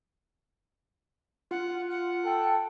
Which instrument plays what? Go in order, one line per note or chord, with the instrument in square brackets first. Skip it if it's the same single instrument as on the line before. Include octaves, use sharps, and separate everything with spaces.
[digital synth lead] F4 [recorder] F#5
[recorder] F#5
[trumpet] A4 [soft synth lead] G5